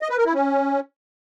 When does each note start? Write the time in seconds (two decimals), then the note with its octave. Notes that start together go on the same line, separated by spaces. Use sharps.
0.02 D#5
0.10 B4
0.18 A#4
0.26 E4
0.34 C#4